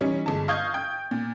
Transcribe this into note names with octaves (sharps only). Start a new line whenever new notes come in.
E3 G3 C#4 D#4
G1 G#3 A5
D#5 F5 C#6 D#6 G6 G#6
G5 D#6 G6
A#2